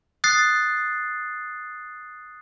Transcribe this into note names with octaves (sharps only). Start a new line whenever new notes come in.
D#6 F#6 A6 C7